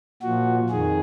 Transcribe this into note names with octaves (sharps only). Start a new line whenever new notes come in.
A#2 F3 F#4
F2 D#3 G#4